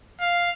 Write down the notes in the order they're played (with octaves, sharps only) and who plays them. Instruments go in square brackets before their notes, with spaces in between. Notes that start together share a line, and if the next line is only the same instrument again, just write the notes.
[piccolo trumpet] F5